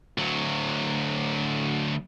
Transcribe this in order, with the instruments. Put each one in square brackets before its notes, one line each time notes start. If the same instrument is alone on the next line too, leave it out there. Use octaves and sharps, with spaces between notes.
[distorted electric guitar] D2 F#3